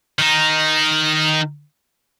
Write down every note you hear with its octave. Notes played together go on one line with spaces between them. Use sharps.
D#3 D#4